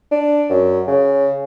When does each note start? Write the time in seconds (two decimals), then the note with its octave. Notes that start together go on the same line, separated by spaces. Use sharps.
0.12 D4
0.50 F#2
0.88 C#3